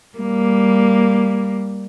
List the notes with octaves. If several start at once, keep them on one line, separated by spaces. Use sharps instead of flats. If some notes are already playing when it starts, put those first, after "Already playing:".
G3 A#3